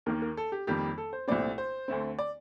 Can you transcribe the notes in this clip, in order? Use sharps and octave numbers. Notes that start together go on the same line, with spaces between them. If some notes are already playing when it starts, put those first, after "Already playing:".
D#2 D#3 A#3 A#4
A#4
A4
G4
F2 D#3 G3 A#3 G4
A4
C5
C2 A#2 A3 C4 D5
C5
D2 D3 A3 C4
D5